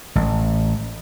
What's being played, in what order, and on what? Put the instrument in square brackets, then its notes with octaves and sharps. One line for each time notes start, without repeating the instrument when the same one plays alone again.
[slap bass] A1